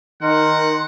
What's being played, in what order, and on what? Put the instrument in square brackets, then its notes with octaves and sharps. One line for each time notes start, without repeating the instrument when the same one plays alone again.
[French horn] D#3 [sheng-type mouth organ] D#4 A#4 [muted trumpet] F#5 [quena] C6